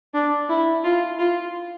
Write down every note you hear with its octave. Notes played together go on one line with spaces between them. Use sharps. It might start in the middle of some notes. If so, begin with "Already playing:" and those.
D4
E4
F4
F4